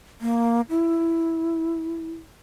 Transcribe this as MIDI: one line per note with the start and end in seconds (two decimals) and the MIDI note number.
0.21 0.61 58
0.70 2.11 64